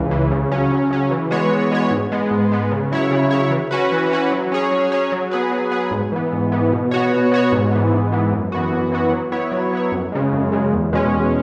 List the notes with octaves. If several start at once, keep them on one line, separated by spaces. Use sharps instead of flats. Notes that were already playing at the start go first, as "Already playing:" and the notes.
Already playing: C#2 C#3 E3
C#3 E3
C#3
F#3 C#4
C#3
F#3 C#4
E3
G#3 B3 F#4 C#5
E3
G#3 B3 F#4 C#5
G#2
G#3 B3
G#2
G#3 B3
C#3
F#3 E4 C#5
C#3
F#3 E4 C#5
E3
C#4 F#4 B4
E3
C#4 F#4 B4
F#3
C#4 G#4 C#5
F#3
C#4 G#4 C#5
F#3
B3 G#4 B4
F#3
B3 G#4 B4
G#2
E3 B3
G#2
E3 B3
B2
B3 F#4 C#5
B2
B3 F#4 C#5
G#2
E3 B3
G#2
E3 B3
F#2
E3 B3 F#4
F#2
E3 B3 F#4
F#3
B3 E4 C#5
F#3
B3 E4 C#5
F#2
C#3 G#3
F#2
C#3 G#3
E2
B2 G#3 C#4
E2